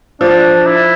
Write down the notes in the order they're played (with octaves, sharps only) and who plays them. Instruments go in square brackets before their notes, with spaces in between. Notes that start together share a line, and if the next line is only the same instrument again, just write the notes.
[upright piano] F3 [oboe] D4
[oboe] E4